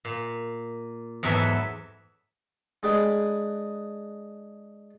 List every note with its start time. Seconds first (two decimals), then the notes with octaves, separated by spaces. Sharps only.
0.05 A#2
1.23 E2 G#2 F#3 A4 B4 E5
2.83 G#3 D4 G#4 B4 G5